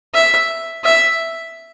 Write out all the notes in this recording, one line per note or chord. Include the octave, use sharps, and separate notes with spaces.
E5
E5